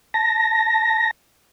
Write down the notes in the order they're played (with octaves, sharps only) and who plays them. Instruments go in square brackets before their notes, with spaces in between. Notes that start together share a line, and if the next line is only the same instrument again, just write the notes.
[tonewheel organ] A5 A#6